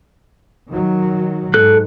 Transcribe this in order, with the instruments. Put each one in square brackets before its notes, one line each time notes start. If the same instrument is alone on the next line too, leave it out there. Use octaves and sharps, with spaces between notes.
[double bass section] D#3 F#3
[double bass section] G#2 [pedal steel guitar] A4 F#6